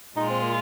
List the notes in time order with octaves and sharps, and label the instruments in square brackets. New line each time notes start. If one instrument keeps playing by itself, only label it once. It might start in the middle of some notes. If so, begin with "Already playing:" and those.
[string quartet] A#2 G#3 F4 [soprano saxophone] D#4
[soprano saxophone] C4
A#3